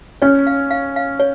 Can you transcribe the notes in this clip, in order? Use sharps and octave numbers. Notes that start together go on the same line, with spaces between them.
C#4 C#5
F5
F5
F5
C#5